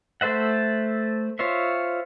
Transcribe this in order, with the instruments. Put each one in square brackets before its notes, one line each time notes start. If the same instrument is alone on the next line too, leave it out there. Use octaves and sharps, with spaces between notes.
[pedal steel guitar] A3 A4 C5 E5 F#5
F4 C5 C#5 E5